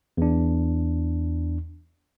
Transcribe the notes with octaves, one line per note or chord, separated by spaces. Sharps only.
E2 D4